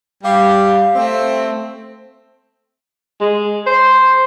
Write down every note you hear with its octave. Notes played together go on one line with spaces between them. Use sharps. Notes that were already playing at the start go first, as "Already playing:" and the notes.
G3 G4 F5
A3 C4
G#3
C5